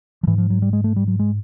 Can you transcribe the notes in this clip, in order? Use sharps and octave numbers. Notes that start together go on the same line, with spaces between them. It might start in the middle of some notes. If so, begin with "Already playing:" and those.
F3
G#2 E3
F3
F#3
G3
G#3
A3
G3
F#3
G#3